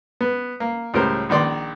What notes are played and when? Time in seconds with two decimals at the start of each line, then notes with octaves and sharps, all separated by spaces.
0.21 B3
0.60 A#3
0.94 C#2 A2 G3 A#4 C5
1.29 A#1 D#3 D5 C6